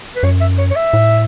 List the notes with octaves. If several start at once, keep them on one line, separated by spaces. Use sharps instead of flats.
B4
F#2 C#5
E5
C#5
C#5
E5
A2